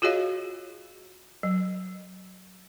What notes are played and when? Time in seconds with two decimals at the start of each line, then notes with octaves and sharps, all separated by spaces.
0.02 F4 F#4 G#4 C#5 D#5 F5
1.43 F#3